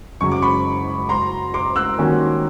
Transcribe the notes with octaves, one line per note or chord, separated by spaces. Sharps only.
F#2 C#3 F#3 C#6
D6
B5 C#6
A#5 C6
C6 D6
E6 F#6
D#3 G3 A#3 C#4 F#4